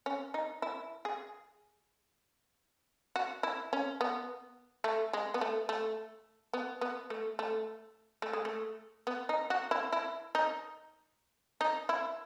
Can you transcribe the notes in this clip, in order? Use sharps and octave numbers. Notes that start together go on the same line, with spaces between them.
C#4
D#4
E4
G#4
F#4
E4
C#4
B3
A3
G#3
B3
A3
A3
B3
B3
A3
A3
A3
G#3
A3
B3
D#4
F#4
E4
E4
D#4
D#4
E4